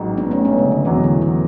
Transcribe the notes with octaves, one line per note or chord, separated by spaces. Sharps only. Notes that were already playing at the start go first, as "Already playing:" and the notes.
Already playing: A1 G#2 F#3
B3 D4
A3 C#4
G#3 B3
C#3
D3
E2 B2 E3 F#3
D3
E3